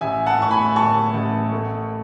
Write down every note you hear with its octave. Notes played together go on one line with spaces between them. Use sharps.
A1 E5 G#5
F#5 A5
A2 C#6
G#5 B5
A2 A5 C#6
A1
A3